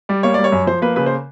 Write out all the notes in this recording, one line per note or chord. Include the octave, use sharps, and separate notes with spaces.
G3 D5
A#3 C#5
G3 D5
C#5
F#2
F3 C5
A#3 B4
C#3 B4
C5